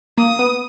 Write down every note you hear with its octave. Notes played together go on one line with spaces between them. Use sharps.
A#3 D#6
B3